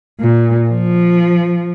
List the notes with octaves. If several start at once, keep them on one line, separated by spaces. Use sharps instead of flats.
A#2
F3